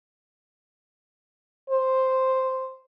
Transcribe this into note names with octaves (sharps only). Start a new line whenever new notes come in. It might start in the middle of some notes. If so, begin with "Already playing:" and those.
C5